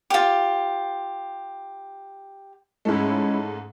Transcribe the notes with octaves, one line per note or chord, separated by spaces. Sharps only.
F4 G4
G#2 C#3 G#3 A3 C#4 E4